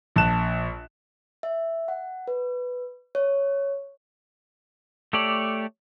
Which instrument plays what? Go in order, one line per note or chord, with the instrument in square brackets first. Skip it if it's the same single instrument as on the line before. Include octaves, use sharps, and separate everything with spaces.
[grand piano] A#1 A5 F#6 E7
[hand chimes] E5
F#5
B4
C#5
[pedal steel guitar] A3 G4 A4 C#5 D5